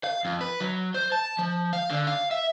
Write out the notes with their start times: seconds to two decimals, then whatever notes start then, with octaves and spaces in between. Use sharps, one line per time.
0.04 F5
0.25 F2
0.41 B4
0.61 F#3
0.94 C5
1.12 A5
1.39 F3
1.73 F5
1.90 D3
2.07 F5
2.31 E5